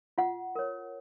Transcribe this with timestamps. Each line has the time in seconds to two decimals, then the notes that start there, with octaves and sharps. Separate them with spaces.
0.18 F4 F#5
0.55 A#4 C#5